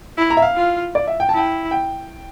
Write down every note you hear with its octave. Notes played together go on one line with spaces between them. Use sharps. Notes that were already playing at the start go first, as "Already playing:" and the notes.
E4
A#5
E5
F5
F4
D5
E5
G5
A5
E4 G5
G5